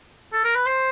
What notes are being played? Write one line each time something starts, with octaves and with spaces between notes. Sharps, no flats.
A4
A#4
B4
C5